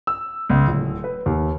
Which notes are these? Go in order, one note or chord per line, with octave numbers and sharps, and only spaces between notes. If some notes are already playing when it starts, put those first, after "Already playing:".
E6
C#2
D1
B4
D#2